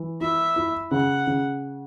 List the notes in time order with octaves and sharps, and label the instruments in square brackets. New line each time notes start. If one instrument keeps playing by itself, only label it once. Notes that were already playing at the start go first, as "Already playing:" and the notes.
Already playing: [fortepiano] E3
[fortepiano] E4 [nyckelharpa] E5
[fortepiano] E4
[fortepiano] C#3 [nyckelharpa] F#5
[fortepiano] C#3